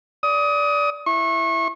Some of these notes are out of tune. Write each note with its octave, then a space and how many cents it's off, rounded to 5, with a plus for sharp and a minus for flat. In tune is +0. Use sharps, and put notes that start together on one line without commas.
D5 -15 D#6 +20
E4 +0 C#6 -35